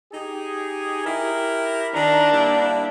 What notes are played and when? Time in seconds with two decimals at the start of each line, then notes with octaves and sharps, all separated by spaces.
0.13 D#4 G4 G#4
1.05 E4 G4 A#4
1.95 D#3 D4 A#5
2.33 G3 A#3 E4